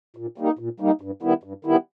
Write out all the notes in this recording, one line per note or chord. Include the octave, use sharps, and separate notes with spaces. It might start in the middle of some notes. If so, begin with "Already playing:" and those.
A#2
G3 A#3 D#4
A#2
G3 A#3 D#4
G2
D#3 G3 B3 E4
G2
D#3 G3 B3 E4